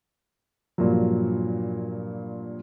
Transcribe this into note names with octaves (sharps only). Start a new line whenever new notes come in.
G2 A#2 F3 F#3